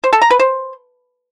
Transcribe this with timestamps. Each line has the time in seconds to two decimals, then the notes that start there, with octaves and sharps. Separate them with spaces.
0.04 C5
0.13 A4
0.22 A#5
0.31 B4
0.39 C5